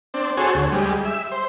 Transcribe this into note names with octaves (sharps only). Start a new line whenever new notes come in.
C4 D4
F#4 G#4 A4 C5 C#5
D2
G3 G#3
E5
C5